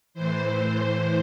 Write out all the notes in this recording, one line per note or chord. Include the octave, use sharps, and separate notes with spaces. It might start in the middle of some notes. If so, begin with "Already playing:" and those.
A2 E3 C5